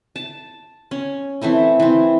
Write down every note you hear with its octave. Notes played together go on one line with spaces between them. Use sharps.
A5
C#4
E3 A3 C4 E4
E3 C4